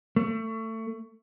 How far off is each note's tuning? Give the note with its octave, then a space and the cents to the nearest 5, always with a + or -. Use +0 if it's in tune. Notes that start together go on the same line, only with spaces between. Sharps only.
A3 +25